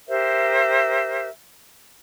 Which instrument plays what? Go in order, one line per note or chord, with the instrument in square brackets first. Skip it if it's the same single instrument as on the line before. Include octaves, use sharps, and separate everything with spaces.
[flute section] G4 A#4 C5 E5